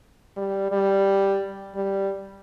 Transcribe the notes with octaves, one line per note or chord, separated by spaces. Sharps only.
G3
G3
G3